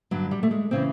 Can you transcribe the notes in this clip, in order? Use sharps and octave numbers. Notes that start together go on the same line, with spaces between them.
G2 D3 F#3
G3
A3
G#3
C#3 E3 C4